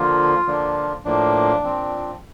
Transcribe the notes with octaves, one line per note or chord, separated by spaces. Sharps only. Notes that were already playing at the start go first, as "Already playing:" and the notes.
Already playing: D3 F3 A#3 F4
D3 F3 A#3 D4
A2 F3 A#3 D4
A#2 F3 C4